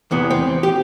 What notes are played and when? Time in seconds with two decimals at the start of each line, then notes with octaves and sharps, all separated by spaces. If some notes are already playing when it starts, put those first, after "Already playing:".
0.11 E2 C3 E3 B3
0.30 C4
0.63 G4